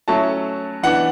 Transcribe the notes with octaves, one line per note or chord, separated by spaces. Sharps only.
F#3 A3 C#4 E4 A5
E3 B3 D4 F#5